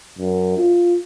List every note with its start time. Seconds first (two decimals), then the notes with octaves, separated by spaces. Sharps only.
0.18 F#2
0.57 F4